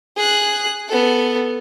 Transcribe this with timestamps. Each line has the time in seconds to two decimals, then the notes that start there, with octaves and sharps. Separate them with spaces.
0.17 G#4 F#6
0.88 B3 A4